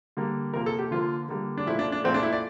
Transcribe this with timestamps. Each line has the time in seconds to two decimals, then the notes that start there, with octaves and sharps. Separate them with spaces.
0.17 D3 G3 A#3
0.53 C3 F3 A#3 A#4
0.66 A4
0.79 G4
0.91 D3 F3 A#3 F4
1.29 D3 G3 A#3
1.58 D4
1.66 A#2 F3 A3 E4
1.79 D4
1.92 D4
2.04 A#2 F3 A3 C4
2.14 D4
2.23 E4
2.33 D5